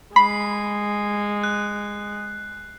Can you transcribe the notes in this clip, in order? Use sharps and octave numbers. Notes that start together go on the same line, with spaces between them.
G#3 B5 C7
F#6